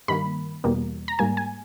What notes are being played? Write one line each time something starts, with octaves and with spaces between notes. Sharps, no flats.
G2 D#3 A#3 B5
E2 B2 G3 A#3
A#5
G#2 G3 A#3 G#5
G#5